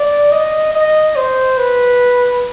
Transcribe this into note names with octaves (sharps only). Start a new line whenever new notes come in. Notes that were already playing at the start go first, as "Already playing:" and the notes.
Already playing: D5
D#5
D#5
C5
B4